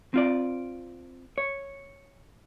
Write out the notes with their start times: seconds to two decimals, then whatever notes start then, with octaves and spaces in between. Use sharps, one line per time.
0.14 C4 F4 D5
1.38 C#5